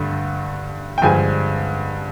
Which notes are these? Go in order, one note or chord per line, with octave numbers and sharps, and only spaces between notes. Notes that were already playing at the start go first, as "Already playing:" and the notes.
Already playing: G2 D3 A3
G5
G2 D3 F3 G#3 G#5